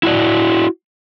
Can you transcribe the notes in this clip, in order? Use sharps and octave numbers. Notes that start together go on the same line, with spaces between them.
E4 F#4 D5